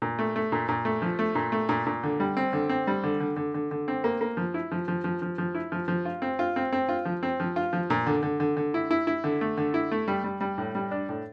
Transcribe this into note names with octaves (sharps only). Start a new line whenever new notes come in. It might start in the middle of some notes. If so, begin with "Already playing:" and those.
A#2
A3
A3
A#2
A#2
A3
F3
A3
A#2
A3
A#2
A#2
D3
G3
C4
D3
C4
G3
D3
D3
D3
D3
D3
C4
A#3
A#3
F3
E4
F3
F3
F3
F3
F3
E4
F3
F3
F4
C4
F4
C4
C4
F4
F3
C4
F3
F4
F3
A#2
D3
D3
D3
D3
E4
E4
E4
D3
A3
D3
E4
A3
G3
G3
G3
A2
G3
D4
A2